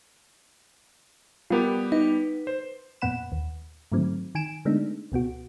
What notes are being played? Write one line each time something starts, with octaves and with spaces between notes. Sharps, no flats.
G3 B3 F4 G4 A#4
D#4 B4
C5
F2 A#2 B3 F#5 B5 E7
D#2
G#2 D3 D#3 F#3 A3 C4
D#3 G#5 D7 E7
D3 G#3 A3 B3 D4 D#4
C#2 B2 B3 F#4